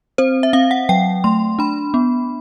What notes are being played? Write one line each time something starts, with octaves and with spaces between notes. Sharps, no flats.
C4 C5
E5
C4 F5
F#5
F#3 G5
A3 C6
D4 B5
B3